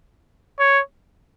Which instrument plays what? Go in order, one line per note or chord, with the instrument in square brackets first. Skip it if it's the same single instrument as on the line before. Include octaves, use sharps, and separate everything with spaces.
[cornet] C#5